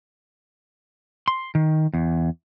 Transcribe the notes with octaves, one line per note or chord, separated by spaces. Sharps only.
C6
D#3
E2